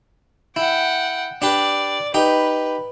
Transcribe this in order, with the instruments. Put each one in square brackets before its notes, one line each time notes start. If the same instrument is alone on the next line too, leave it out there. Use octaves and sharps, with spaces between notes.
[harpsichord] E4 [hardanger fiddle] F#5 G5
[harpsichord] D4 G4 B4 [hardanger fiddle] D5
[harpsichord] D#4 G4 [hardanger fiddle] B4